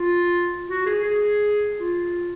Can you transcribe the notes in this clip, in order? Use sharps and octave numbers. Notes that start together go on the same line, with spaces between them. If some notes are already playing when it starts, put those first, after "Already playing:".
Already playing: F4
F#4
G#4
G#4
F4